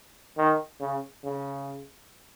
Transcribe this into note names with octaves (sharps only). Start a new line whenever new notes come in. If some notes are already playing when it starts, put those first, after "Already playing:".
D#3
C#3
C#3